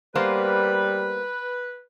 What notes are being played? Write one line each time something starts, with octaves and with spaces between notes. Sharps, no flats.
G3 A#3 B3 B4 C5